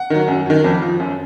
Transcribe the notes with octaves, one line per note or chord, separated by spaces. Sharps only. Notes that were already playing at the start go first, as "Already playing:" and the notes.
Already playing: F#5
D#3 F#3
F#2
D#3 F#3
F2
F3
F#2